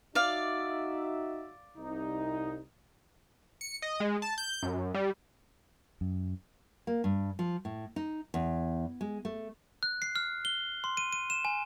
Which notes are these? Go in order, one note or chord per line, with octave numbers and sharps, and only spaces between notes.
D#4 F#4 D5 E5 F5
C2 D#4
C#7
D#5
G#3
A5
G6
F#2
G3
F#2
A#3
G2
F3
A2
D#4
E2
G#3
A3
F#6
C7
F6
G7
C6
D#7
D#7
E7
G#5